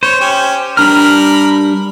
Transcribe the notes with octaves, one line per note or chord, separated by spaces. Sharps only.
C5 C#5
C#4 G4
G3 D4 A#4 B5 F6